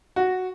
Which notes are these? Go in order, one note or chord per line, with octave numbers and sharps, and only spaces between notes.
F#4